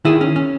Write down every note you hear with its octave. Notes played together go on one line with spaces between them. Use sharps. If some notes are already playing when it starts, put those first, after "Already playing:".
D#3 E4 G#4
C#4
C#4